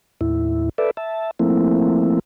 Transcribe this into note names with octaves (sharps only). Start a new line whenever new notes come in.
D#2 A2 E4
A4 B4 D5 E5
E5 A5
F3 A3 A#3 C4 E4